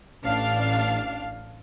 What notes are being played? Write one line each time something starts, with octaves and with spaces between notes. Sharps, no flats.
A1 D4 F5